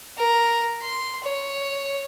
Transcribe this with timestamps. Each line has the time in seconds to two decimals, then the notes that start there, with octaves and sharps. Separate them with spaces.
0.17 A#4
0.81 C6
1.23 C#5